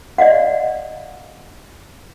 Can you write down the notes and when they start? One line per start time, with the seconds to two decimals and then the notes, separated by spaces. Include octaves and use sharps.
0.18 D5 D#5 F5 F#5